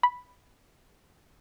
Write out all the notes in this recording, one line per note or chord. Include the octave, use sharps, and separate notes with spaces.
B5